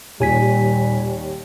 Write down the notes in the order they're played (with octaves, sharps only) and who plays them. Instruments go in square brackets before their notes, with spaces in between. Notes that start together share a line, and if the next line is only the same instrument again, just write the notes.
[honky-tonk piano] D#2 [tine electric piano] A#2 G#5 B6 [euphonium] G3